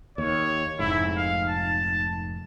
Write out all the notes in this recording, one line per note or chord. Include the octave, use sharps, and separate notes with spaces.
D#2 C#5
F1 G#2 E4
F5
A5